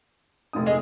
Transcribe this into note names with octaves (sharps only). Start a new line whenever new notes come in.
F1 A#2 D#6
G#3